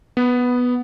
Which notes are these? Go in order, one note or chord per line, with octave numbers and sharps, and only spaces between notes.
B3